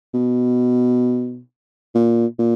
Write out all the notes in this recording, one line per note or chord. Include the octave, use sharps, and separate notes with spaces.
B2
A#2
A#2